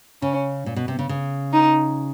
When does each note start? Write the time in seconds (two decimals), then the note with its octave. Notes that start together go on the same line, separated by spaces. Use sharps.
0.22 C#3 C#4
0.66 A#2
0.76 B2
0.88 C3
0.99 C#3
1.09 C#3
1.53 D#4